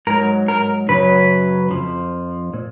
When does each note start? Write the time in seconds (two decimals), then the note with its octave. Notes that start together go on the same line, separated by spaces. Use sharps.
0.07 G#2 F#3 A#4
0.48 A#4
0.89 F#2 C#3 F#3 B4
1.71 F2 F3
2.54 A#2